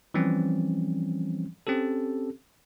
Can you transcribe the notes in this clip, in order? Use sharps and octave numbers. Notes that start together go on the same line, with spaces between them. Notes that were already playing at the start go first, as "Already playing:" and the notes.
E3 F3 G3 C4 C#4
C4 C#4 G4 A4